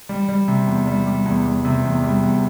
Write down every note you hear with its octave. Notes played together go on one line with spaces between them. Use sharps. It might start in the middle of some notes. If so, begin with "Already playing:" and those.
G3
G3
C3
E2
G3
G3
E2
G3
C3
E2
G3
E2